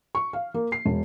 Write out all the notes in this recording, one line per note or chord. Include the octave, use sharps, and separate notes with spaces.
C#6
F5
A#3
C7
E1